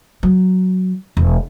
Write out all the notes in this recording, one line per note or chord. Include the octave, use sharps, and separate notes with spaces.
F#3
E1